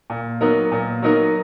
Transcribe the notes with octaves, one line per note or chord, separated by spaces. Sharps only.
A#2
F#3 B3 D#4 A#4
A#2
F#3 B3 D#4 A#4